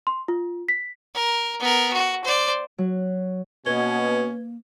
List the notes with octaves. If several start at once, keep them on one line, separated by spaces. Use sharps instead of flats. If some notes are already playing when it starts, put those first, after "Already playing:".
C6
F4
B6
A#4
B3 A#4
F#4
C5 D5
F#3
B2 A#3 C#4 B4 G#6 G7